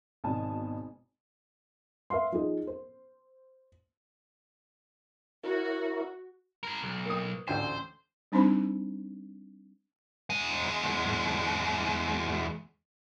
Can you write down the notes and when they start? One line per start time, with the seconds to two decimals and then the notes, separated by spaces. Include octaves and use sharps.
0.24 G#1 B2 G#5 A5
2.10 B4 E5 F5 C6
2.32 F3 D#4 G#4
2.67 C5
5.44 E4 F#4 A#4 C#5
6.63 G#4 A#4
6.82 B1
7.06 A#3 D#6
7.48 A1 D2 C5 G#5
8.32 G3 C4 D4 D#4 C5 B5
10.30 E2 G#3